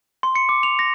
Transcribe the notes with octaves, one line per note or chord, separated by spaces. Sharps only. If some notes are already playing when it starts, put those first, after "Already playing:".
C6
C#7
D6
F7
A#6